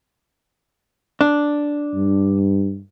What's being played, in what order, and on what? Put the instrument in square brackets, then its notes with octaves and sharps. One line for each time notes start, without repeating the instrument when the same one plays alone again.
[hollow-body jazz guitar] D4
[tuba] G2